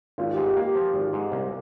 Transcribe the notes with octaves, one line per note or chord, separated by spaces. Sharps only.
G#1 F4
G#2 G4
G4
A#3 G4
F3
G#1
G#2
C2